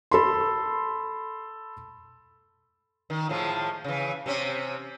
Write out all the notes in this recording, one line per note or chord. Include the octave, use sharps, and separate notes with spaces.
A4 B5 C6
D#3
A2 F3 G#3
C#3 E3
C3 C4 C#4